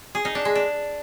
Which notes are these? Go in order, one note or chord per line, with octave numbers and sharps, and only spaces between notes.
G#4
D#4
D4
G#3
D4